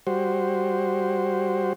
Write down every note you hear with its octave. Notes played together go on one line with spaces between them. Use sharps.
G3 F#4 C5